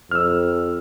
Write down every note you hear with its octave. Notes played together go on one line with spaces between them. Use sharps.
F2 E6 F6